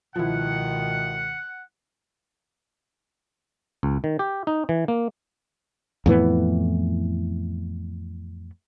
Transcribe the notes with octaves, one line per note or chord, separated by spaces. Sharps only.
C#2 B2 D#3 F3 E4 F#5
C#2
D#3
G4
D#4
E3
A#3
F2 A2 E3 B3